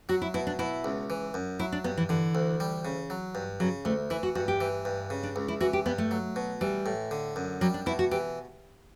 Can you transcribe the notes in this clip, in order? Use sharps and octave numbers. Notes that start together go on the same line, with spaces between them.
F#3 F#4
E4
B2 E4
D4
B2 E4
C#2
E3
F#2
F#3 E4
D4
G2 B3
E3
D3 E3
D2
G3
C#3
F#3
G2
C#3 F#3
D2 A3
E3 E4
F#4
G2 F#4
G4
E3
G2
C#3
D4
C#2
E4
E3 F#4
G4
G2 B3
A3
F#3
B2
E3 G3
A2
D3
F#2
F#3 G3
D4
B2 E4
F#4
E3 G4